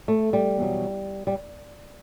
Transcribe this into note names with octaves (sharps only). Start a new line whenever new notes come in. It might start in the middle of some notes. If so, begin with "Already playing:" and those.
A3
G3
E2 B2 F#3
G3